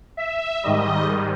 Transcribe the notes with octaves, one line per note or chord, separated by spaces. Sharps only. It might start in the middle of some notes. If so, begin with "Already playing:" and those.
E5
G#2 D#3 G3 D#5